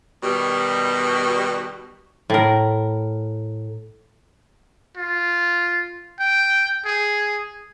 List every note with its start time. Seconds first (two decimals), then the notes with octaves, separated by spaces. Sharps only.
0.24 B2 D#3 G3
2.30 A2 A#4
4.97 F4
6.19 G5
6.85 G#4